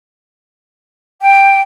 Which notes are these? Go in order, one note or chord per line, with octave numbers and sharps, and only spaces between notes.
G5